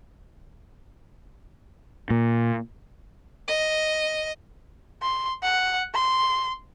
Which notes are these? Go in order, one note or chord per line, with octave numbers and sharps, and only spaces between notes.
A#2
D#5
C6
F#5
C6